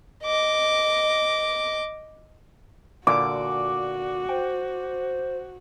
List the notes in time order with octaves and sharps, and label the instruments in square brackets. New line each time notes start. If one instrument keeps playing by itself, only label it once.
[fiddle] D#5 D6
[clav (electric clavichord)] A#2 D3 [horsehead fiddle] F#4 [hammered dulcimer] D6
[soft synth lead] C5 [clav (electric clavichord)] G5